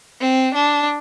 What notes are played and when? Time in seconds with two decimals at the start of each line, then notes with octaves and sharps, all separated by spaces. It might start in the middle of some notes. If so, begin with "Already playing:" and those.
0.20 C4
0.55 D4